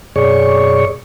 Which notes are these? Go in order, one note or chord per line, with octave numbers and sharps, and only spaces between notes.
F#2 B2 G#4 C#5 D5 C#6